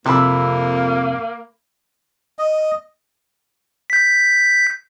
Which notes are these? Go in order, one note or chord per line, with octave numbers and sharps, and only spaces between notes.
F2 C3 A#3 B5 E6
D#5
G6 B6